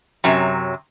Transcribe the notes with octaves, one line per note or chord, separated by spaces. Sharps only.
F#2 C3 F#3